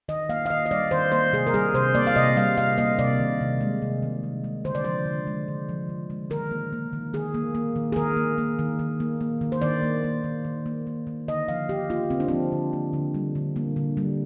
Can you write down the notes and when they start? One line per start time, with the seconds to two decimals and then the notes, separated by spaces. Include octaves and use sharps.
0.09 D#3 D#5
0.29 A#3 F5
0.46 F5
0.50 D#3 D#5
0.66 D#5
0.71 G3 D5
0.91 D#3 C5
1.12 A#3 C5
1.33 C3 G#4
1.47 A#4
1.54 G3 G#4
1.74 C3 C5
1.95 A#3 D5
2.07 F5
2.16 C3 D#5
2.36 G3 F5
2.58 C3 F5
2.78 A#3 D#5
2.99 C3 D5
3.19 D#3
3.41 C3
3.61 G#3
3.82 C3
4.02 D#3
4.23 C3
4.44 G#3
4.65 D3 C5
4.75 D5
4.85 F3 C5
5.06 D3
5.27 G#3
5.48 D3
5.69 F3
5.89 D3
6.10 G#3
6.30 D#3 A#4
6.51 A#3
6.72 A#3
6.93 D#3
7.13 D#3 G#4
7.34 A#3
7.55 A#3
7.76 D#3
7.92 G#4
7.96 D#3 A#4
8.17 A#3
8.38 A#3
8.59 D#3
8.79 D#3
9.00 A#3
9.21 A#3
9.41 D#3
9.52 C5
9.62 D#3 D5
9.83 A#3
10.04 A#3
10.24 D#3
10.45 D#3
10.66 A#3
10.87 A#3
11.07 D#3
11.28 D3 D#5
11.48 F3 F5
11.69 D3 G4
11.90 A#3 F4
12.10 D3 C4
12.20 D4
12.28 F3 C4
12.52 D3
12.73 A#3
12.93 D3
13.14 G3
13.35 D3
13.56 A#3
13.76 D3
13.97 G3